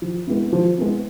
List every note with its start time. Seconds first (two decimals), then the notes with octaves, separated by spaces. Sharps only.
0.02 F3
0.27 G#3 B3 E4
0.53 F3
0.78 G#3 B3 E4